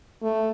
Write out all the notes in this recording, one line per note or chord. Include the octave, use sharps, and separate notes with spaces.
A3